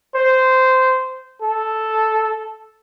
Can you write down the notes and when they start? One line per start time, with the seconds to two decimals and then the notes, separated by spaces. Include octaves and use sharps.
0.15 C5
1.42 A4